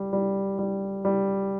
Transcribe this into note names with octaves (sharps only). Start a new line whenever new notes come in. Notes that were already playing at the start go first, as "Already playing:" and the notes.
Already playing: G3
G3
G3
G3